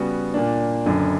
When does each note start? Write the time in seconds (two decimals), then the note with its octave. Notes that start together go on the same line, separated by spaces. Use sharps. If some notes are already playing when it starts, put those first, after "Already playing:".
Already playing: C#3 G3 B3 F#4
0.34 A#2 A#3 D4
0.86 F#1 F#2 D3